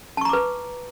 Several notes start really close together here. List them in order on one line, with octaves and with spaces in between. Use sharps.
A5 C#6 A#5 D6 B4